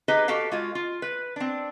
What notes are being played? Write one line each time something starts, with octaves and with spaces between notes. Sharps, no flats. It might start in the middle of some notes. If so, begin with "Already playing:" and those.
D#4 G4 G#4 B4 D#5
F#4 G4 A4 F5
G#3 F4 F#4
F4
B4
C4 D4